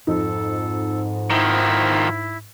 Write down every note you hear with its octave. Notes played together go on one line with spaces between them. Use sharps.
F2 G#2 D#4 A4
D#3 F3 E4